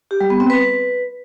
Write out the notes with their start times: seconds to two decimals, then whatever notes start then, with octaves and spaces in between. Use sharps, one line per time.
0.11 G4
0.21 G3
0.30 B3
0.40 C4
0.50 B4